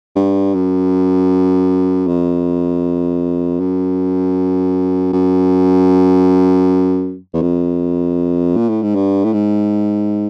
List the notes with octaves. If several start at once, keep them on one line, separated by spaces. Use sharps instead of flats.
G2
F#2
F2
F#2
F#2
E2
F2
A#2
A2
G#2
G2
A2
G#2